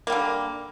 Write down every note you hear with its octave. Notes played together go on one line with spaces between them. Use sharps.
D3 G3 A#3